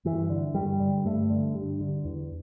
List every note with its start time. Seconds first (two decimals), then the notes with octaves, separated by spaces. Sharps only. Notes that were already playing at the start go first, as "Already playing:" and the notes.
0.05 G2 E3
0.30 D3
0.54 G2 G3
0.80 D3
1.05 G2 A3
1.30 D3
1.55 G2
1.80 D3
2.05 E2